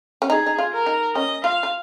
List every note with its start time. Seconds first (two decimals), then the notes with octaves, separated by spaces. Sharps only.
0.22 C#4
0.29 D#4 G#4
0.46 D#4
0.59 F4
0.73 A#4
0.86 D#4
1.15 C#4 D#5
1.44 F4 F5
1.63 F4